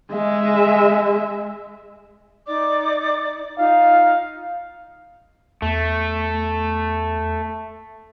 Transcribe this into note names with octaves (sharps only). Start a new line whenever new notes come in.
G#3 E5
D#4 D5 D6
D#4 F4 F5
E2 A3